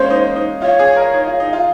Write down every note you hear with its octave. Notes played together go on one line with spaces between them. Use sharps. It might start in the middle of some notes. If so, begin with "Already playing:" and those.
Already playing: G#3 A#3 C#4 C5
D#4
D#4
F4 C#5
G#4
A#4
D#4
F4
D#4
F4